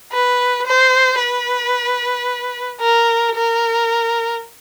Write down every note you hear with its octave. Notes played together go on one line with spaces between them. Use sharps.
B4
C5
B4
A#4
A#4